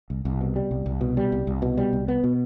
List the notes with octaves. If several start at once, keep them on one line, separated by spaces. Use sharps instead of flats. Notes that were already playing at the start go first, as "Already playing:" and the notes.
C2
C2
B2
G3
C2
C2
B2
G3
C2
C2
B2
G3
C2
B3
B2